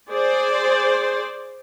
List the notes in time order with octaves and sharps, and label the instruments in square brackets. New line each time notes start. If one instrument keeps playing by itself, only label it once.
[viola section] G#4 C5 D5